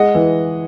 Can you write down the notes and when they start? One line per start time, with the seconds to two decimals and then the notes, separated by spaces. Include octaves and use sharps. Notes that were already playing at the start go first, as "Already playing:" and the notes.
Already playing: G#3 D#5 F#5
0.15 E3